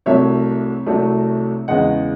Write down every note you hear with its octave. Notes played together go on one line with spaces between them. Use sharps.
C2 C3 F#3 A3 C#5 E5
C2 C3 F#3 A3
E2 C#3 G#3 D#5 F#5